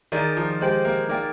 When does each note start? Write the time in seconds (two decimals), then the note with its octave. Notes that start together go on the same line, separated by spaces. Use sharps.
0.12 D#3 D#4 G#4 D5
0.37 F3
0.60 G#3 G4 C5 G5
0.85 A#3
1.09 A#3 D#4 G#4 D5 G5